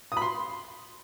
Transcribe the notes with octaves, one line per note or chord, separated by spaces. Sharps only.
D#6
B5
C6